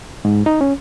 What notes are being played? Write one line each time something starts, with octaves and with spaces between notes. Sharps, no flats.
G#2
D#4
C#4